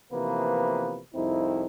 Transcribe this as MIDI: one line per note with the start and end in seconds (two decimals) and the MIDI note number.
0.12 0.99 48
0.12 0.99 52
0.12 0.99 53
0.12 0.99 58
0.12 0.99 59
0.12 0.99 71
1.15 1.66 36
1.15 1.66 41
1.15 1.66 60
1.15 1.66 63
1.15 1.66 64